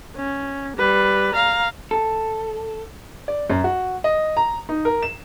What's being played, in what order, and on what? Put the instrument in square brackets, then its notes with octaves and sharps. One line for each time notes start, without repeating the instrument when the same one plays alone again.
[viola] C#4
G3 B4
F5 A#5
[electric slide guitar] A4
[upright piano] D5
F#2
F#4
D#5
A#5
D#4
A#4
E7